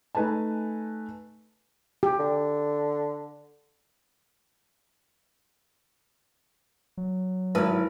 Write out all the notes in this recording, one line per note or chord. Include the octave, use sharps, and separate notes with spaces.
A3 D#4 B4 G#5 A5
G4
D3
F#3
G#1 E4 B4